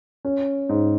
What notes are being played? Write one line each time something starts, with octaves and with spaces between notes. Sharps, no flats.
C#4
G#2